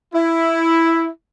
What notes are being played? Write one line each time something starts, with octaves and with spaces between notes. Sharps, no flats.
E4